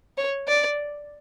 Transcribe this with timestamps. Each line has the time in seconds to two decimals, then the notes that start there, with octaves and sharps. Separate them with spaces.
0.17 C#5
0.48 D5